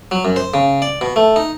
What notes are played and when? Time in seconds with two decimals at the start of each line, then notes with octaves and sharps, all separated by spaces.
0.11 F#3
0.25 F#2
0.36 C5
0.54 C#3
0.82 D5
1.01 B2
1.16 A3
1.36 D#4